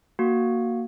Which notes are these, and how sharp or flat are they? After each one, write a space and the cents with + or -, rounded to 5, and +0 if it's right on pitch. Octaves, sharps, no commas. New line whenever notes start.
A#3 +0 F#4 +0